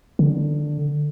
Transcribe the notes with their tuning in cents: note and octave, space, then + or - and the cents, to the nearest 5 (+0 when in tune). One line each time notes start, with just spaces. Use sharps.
D3 +10